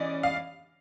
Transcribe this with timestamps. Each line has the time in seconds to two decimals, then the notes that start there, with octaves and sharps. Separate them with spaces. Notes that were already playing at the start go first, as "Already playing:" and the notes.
Already playing: E3 C#4 D5 D#5
0.23 F5